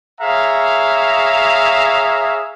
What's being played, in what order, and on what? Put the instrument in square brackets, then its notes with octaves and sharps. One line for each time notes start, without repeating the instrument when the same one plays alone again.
[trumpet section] G#4 C#5 E5 F5 A#5